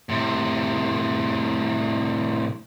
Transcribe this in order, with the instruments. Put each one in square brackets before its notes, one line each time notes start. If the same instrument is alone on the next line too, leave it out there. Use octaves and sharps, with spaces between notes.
[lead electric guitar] A2 C3